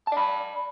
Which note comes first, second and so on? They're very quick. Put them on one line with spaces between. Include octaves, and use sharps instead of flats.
A5 D5 B5